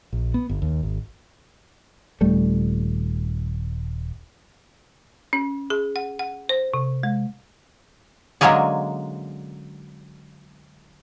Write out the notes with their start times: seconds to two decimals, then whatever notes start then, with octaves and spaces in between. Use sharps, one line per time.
0.13 A#1
0.34 B3
0.49 G1
0.62 D#2
0.83 G#1
2.21 D#1 G3 A3
5.33 C#4
5.70 G#4
5.96 F#5
6.19 F#5
6.49 C5
6.74 C3
7.03 G#3
8.41 D3 F#3 G#3 A#3 C#4 G#4